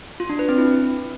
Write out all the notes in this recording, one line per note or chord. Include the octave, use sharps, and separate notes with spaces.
F4
D4
B4
C4
E4